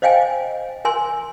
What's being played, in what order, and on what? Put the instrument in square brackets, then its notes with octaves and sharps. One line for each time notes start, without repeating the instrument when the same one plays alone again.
[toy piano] C5 D#5 F5 G5 G#5
A#4 G#5 C6